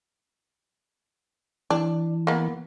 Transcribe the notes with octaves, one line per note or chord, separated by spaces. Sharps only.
E3 D4
A#3 B3